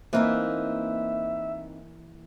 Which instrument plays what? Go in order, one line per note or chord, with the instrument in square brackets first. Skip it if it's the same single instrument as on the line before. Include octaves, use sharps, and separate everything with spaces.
[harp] E3 A#3 [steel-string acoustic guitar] C4 D#4 E4 [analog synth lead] E5